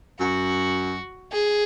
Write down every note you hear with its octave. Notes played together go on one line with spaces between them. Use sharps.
F#2 F#4
G#4